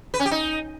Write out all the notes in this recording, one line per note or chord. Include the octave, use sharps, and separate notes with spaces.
B4
C#4
G4
D#4